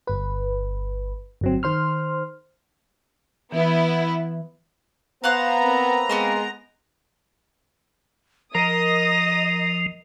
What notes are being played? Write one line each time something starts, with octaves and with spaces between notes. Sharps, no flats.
G1 B4
G1 F#3 C4
D#3 C5 C6 F6
E3 B3 E4
B3 C5 F5 F#5 A#5 F#6
A#3 C4 B4
G#3 B3 A#4 C5
F3 A#4 D#5 D#6 A#6